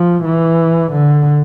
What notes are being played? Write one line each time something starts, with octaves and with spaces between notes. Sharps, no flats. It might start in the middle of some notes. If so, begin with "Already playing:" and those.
Already playing: F3
E3
D3